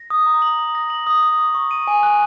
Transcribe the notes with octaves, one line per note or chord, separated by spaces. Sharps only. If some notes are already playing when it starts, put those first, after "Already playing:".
Already playing: A#6
D#6
A#5
F#7
D#6
A#6
F#7
D#6
D#6
C#6
C#6
D#7
G#5
F#6